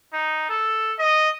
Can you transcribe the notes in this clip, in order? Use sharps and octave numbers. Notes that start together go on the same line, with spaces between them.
D#4
A4
D#5